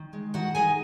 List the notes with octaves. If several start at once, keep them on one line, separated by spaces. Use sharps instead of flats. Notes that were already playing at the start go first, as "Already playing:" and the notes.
Already playing: D#3
G#3
D#3 F#4 F#5
D#4 G#4 G#5